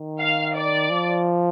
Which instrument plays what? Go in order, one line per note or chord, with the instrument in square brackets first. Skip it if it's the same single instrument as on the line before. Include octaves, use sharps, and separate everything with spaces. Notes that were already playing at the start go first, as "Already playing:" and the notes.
Already playing: [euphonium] D#3
[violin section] F5
D5
[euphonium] F3